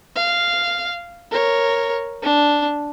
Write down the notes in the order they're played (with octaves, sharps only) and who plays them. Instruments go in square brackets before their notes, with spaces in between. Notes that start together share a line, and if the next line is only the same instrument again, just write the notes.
[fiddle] F5
A#4 C#5
D4